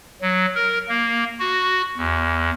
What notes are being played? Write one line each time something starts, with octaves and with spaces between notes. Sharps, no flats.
F#3
A#4
A#3
F#4
E2